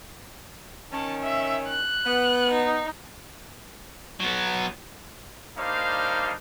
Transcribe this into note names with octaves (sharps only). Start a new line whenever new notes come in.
D#3 C#4 A5
E5
F#6
B3
D#4
F#3 B3
G3 A#3 D4 D#4 C5 F5